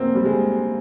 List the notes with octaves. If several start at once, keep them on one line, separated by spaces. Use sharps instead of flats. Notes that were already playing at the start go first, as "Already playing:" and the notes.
Already playing: D2 C#3 F3 G#3 A#3 C4
G3
G#3